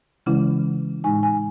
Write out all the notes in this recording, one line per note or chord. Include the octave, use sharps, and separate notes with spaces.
C#3 E3 G#3 C#4 E4
A2 G#3 D#4 G#5
G#5